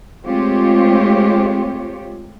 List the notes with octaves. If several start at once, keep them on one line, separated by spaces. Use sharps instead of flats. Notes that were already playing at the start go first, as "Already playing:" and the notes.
G#3 A3 C4 F4 G4 C#5